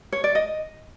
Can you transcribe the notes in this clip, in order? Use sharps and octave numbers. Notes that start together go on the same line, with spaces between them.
C#5
D5
D#5